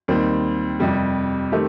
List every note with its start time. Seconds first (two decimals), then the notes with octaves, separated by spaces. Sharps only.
0.08 D#2 D#3 G3 C4
0.80 F2 C3 G3
1.52 D#3 A3 C4 G4